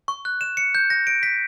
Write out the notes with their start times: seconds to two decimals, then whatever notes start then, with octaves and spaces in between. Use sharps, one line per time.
0.08 C#6
0.25 F#6
0.41 E7
0.57 C#7
0.75 G6
0.90 A#6
1.07 D7
1.23 B6